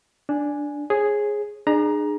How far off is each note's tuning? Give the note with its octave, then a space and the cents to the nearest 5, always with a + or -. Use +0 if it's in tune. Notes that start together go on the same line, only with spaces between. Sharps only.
D4 -5 G#5 +0
G#4 +0 C#5 -40
D4 +45 G#4 +0 A#5 +15